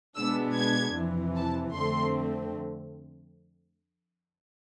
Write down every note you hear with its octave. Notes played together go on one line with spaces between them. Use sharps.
B2 G#3 B3 D4 E6
G#6
F2 C3 E3
A5
F2 D3 A3 C4 C6